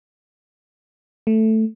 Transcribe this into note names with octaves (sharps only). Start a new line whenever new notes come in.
A3